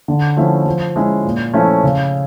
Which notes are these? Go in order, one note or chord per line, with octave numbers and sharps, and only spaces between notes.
D3
F3 A3 C#4 E4
F3
G#3 C#4 E4
A#2
F3 A3 C#4 E4
C#3